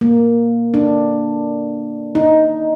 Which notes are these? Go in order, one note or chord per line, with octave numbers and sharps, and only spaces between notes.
A#3
D4
D#4